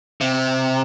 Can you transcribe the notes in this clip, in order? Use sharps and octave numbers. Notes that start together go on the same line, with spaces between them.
C3